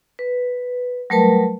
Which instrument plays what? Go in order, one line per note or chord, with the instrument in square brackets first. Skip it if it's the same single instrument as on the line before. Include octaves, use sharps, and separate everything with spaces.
[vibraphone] B4
F#3 G3 A3 A#4 B4 A5